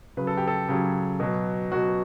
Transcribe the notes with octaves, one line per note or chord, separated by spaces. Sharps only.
C#3 F#3 B4
A4
G4
A4
C#3 F#3 G4
B2 F#3
B2 F#3 F#4